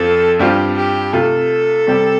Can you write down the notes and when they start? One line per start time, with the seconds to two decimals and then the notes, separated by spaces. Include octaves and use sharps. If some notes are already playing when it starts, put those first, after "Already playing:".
Already playing: F2 F3 C4 F4 A4
0.39 G2 G3 C4 F4 G4
0.77 G4
1.13 C3 A3 F4 A4
1.87 C3 G3 C4 G4